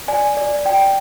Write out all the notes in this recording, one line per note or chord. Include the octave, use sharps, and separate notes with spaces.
D5 G#5
D5
D5 G5